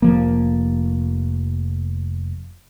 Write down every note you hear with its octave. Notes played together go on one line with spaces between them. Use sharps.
F1 F3 A#3